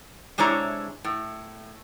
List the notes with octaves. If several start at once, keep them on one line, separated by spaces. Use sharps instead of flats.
C3 G#3 D4 E4 C#5 A#5
A2